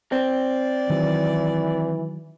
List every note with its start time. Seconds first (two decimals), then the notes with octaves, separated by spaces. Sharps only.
0.12 C4 D5
0.90 D#3 E3 F#3